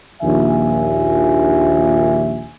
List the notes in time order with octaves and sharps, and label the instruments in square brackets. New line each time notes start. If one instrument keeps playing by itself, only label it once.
[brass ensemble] A#1 D#2 E5 G#5